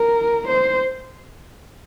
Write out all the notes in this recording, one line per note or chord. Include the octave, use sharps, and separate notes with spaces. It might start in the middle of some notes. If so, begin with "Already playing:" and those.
Already playing: A#4
C5